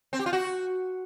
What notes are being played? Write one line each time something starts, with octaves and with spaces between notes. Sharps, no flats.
C4
G4
F4
F#4